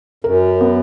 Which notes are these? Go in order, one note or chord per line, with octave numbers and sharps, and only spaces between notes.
F#2 A#4
B3